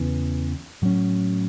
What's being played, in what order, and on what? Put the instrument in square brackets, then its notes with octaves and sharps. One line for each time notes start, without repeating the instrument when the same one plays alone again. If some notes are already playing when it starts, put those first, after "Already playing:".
Already playing: [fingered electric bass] E2 C#3 E3 B3
A2 F#3 C#4